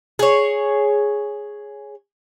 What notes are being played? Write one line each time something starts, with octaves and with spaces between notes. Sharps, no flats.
G#4 C#5